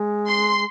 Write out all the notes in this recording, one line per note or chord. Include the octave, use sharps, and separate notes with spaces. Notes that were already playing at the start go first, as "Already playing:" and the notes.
Already playing: G#3
C6